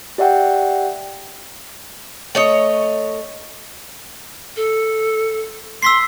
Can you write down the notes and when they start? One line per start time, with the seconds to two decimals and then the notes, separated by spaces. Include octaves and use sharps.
0.18 G4 D5 E5 F#5 G5
2.35 A3 C#5 D#5
4.57 A4
5.82 C6 E6 B6 C7